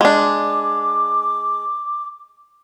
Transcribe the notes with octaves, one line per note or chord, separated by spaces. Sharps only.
G#3 D4 D6